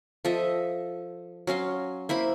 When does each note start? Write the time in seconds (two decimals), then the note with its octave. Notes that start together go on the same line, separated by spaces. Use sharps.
0.25 F3 A4 D#5 E5
1.47 F#3 C#4 F5 C6
2.09 A#3 E4 C5 B5